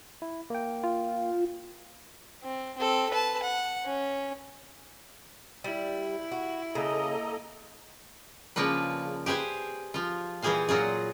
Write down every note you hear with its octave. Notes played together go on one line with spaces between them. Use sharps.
E4
A#3 G5
F4
C4
C4 A4
B4 A5
F#5
C#4
G3 E4
F#4
C#3 A#3 A4 D#5 A#5
C#3 F3 A#3 D4 B4
G4 G#4 B4 C5 G#5
F3 F4
A#2 E3 G3 G#4 C5 F5
A#2 F#3 F4 G#4